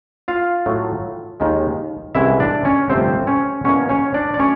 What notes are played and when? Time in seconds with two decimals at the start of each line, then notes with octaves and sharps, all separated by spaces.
0.28 F4 F5
0.66 A2 F#3 A3
1.40 D#2 D#3 G#3
2.15 C2 C3 E3 G#3 C#4 E4 E5
2.40 D4 D5
2.65 C#4 C#5
2.90 G1 F2 C3 F3 A3 C4 C5
3.27 C#4 C#5
3.64 E2 B2 F#3 A#3 C#4 C#5
3.89 C#4 C#5
4.14 D4 D5
4.34 D5
4.39 F#3 A3 C#4 C#5